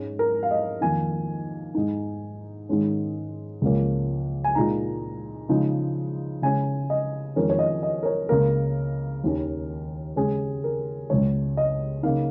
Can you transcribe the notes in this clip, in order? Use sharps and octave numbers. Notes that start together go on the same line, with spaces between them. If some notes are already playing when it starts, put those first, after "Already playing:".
Already playing: G#2 G#3 C#4
A#4
F5
D#5
F2 D#3 A#3 D#4 G#5
G#2 G#3 D#4
G#2 D#3 G#3 C#4
C#2 C#3 F3 A#3 C#4
G#5
A#2 G#3 D#4 A#5
C#3 F3 G#3 D#4
C#3 G#3 C#4 G#5
D#5
F2 D#3 G#3 C#4 A#4
C#5
D#5
D#5
A#4
C#5
C#2 C#3 A#3 A#4
D#2 D#3 C#4
C#3 G#3 C#4 G#4
A#4
C#2 C#3 G#3 C#5
D#5
C#3 A#3 D#4 F5